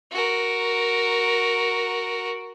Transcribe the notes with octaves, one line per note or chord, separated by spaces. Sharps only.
F#4 A#4